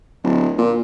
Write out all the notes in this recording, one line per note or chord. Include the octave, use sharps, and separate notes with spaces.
D1
A#2